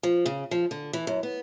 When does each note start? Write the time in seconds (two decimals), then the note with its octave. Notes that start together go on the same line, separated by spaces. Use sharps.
0.03 F3
0.26 C#3
0.51 F3
0.71 D3
0.93 E3
1.07 F#2
1.23 B3